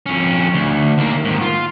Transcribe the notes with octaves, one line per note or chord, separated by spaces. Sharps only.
F2 C#4
D2
D#2 A#3
G#2 D#3
F4